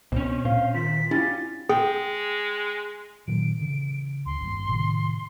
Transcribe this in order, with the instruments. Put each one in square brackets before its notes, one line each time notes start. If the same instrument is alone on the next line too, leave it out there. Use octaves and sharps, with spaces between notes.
[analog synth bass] C#2 [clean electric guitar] B2 [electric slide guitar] C4 C#4
[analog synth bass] A#2 [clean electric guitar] C5 [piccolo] F5
[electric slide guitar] D#3 F4 [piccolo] B6
[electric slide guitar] C#4 [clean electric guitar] D4 F4 G4 [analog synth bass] E4 [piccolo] A6
[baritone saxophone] G#3 [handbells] G#4 [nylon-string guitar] G5
[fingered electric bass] A#2 D#3 F#3 [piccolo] D7
[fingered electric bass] C#3 E3
[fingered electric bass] D2 [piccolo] C6
[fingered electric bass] G#1 E2 G2
A2 C3 D#3